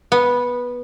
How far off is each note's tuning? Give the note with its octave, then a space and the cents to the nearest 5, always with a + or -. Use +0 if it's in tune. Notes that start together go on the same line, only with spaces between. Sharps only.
B3 -10